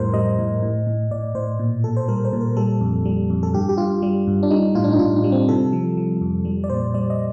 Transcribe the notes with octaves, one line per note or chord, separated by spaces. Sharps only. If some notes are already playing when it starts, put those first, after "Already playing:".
Already playing: F2 A2 G3 A#4 C5
G3 D#5
A2
A2
A2
A2 D5
A2 C5
A#2
A#2 A4
C5
G3 A#4
C5
A#2
A#4
G3 A4
F2
G3
F2
A4
G2 G4
G4
G2 F4
G3
G2
D4
G3 D#4
A2 F4
D4
D#4
A2 F4
D4
G3
C4
C3 A4
F3
F3
F2
G3
D5
A#2 C5
G3 D5
D#5